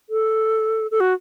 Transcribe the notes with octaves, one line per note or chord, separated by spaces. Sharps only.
A4
A4
F#4